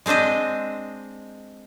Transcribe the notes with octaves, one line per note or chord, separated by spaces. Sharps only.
G#3 C4 D4 C5 D#5